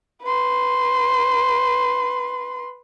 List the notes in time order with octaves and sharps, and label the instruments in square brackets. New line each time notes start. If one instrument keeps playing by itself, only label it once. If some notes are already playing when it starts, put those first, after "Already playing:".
[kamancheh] B4 C6